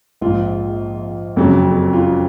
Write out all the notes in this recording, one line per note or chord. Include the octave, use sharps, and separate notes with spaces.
A#1 G#2 F3 F4
F#1 F2 C#3 F#3 A#3
F4